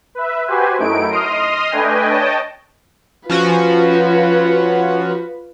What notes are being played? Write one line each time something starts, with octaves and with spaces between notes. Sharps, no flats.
B4 E5
F#4 G4 B4 C5 G#5
F#2 A3 D#4 E4 D7
D#5 C6 D#6 F6
A3 D4 B4 D#5 G5 G#5
C#5 D#5 G5 A5
F3 C#4 F4 F#4 B4